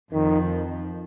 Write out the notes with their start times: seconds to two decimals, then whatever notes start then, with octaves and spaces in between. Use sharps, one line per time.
0.13 F2 D#3 F3